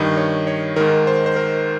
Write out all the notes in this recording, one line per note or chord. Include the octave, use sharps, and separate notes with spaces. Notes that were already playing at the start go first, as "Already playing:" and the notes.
Already playing: G2 D#3 D#5
C#5
C#5
G#2 D#3 A#4
C5
C5
A#4